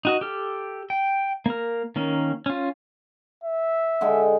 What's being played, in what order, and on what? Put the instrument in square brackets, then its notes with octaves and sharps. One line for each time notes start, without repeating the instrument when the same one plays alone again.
[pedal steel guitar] D#4 F#4 D#5
G4 A4 F6
G5
A#3 A#4
D#3 A#3 C#4
C#4 F4
[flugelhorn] E5
[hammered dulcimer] D3 G#3 G5